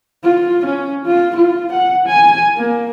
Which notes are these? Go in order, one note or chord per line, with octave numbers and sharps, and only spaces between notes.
F4
C#4
F4
F4
F#5
G#5
A#3